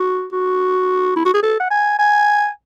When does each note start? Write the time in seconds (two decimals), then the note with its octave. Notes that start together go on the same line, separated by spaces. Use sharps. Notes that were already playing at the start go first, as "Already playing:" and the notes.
Already playing: F#4
0.32 F#4
1.16 E4
1.25 F#4
1.34 G#4
1.43 A4
1.60 F#5
1.70 G#5
1.98 G#5